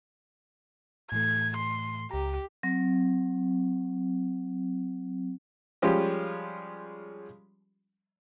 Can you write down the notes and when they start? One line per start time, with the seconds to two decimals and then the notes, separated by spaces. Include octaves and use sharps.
1.12 A2 E3 A3 G#6
1.57 C6
2.11 C#2 G4 A#5
2.63 F#3 C4
5.82 F3 G3 G#3 C#4 F4 G4